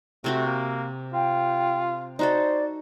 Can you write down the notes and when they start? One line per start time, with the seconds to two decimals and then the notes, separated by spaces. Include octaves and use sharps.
0.24 C3 A3 C4 F#4
0.46 A#3
1.13 F4 G5
2.19 D#4 F#4 A4 C5 D5